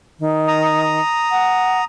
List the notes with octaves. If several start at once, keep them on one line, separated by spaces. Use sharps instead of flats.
D#3
A#5 D#6
F#5